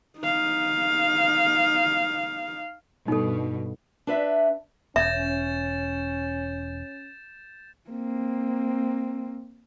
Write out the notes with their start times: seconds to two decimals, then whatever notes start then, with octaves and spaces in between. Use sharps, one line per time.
0.20 D#4 F5
3.08 G2 B2 D#4 A4
4.07 D4 B4 E5
4.96 E1 C#4 E5 G6 A6 E7
7.90 A#3 C4